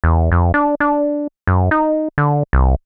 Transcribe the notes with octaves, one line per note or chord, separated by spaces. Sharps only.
E2
F2
D4
D4
F#2
D#4
D3
C2